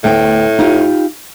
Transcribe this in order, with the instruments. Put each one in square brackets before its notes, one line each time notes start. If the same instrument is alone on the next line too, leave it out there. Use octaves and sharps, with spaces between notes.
[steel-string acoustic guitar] D2 B3 G5 [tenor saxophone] A2
[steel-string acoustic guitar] D#4 F4 G4